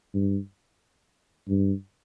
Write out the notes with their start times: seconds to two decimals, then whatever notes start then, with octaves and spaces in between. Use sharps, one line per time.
0.14 G2
1.49 G2